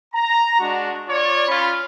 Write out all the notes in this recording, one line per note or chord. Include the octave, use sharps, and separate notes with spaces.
A#5
G#3 D4 F#4
F4 C#5 D5
C#4 F4 B5